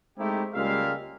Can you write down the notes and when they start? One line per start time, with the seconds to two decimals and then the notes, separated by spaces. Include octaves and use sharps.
0.18 G#3 A3 C4 D#4 E4 G4
0.54 C#2 G3 G#3 A#3 E5 F5